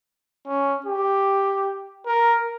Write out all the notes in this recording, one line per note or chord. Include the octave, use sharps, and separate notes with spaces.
C#4
G4
A#4